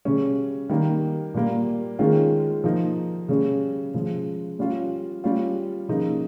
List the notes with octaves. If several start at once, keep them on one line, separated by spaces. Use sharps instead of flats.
C#3 G3 C#4
D#3 G3 A#3
A#2 G3 A#3
D#3 G#3 C#4 F4
F3 A#3 D#4
C#3 G3 C#4
C#3 F3 G#3
G3 C#4 F4
G3 C#4 F4
C#3 F3 A#3 D#4